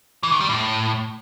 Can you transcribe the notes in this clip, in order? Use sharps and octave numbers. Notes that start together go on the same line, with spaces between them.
E3
D#3
G3
A2